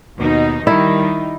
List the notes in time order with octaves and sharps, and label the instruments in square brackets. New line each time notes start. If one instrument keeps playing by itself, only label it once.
[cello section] D#2 B2 D#4
[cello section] D#3 G3 D#4 [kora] E4